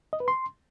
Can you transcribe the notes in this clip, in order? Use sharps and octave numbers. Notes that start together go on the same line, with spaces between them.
D#5
B4
C6